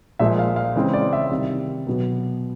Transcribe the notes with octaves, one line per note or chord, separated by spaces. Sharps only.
A#2 F3 G#3 E5
F5
F5
C#3 E3 G#3 C4
D5
E5
C3 D#3 G3
B2 F#3 B3